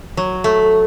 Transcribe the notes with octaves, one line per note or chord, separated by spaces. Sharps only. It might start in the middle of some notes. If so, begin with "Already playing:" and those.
F#3
A3